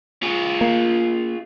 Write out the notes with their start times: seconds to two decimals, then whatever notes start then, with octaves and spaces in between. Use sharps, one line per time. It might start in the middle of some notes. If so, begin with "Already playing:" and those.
0.23 F4 G#4
0.61 A#3